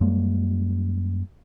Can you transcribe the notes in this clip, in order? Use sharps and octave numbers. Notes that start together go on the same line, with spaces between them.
F#2 G3 G#3 A#3